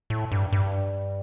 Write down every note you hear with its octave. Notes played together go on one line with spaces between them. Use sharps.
A2
G2
G2